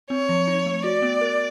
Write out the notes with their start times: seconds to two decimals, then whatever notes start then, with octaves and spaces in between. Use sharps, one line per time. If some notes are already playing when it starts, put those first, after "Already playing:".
0.10 C4 C#5
0.29 F3
0.48 D#4
0.66 A3
0.84 F#4 D5
1.02 B3
1.21 A#4